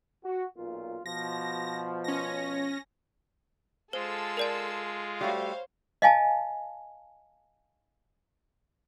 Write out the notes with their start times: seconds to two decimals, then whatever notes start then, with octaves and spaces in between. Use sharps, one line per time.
0.25 F#4
0.57 B1 A#2 F4
1.06 B2 F3 A#6
2.04 C#4 A#6
3.93 G#3 F4 A4 C5 E6
4.37 A#4 D5 A5
5.21 G3 A3 F#4 C5 C#5 F5
6.02 D#5 F5 G#5 A5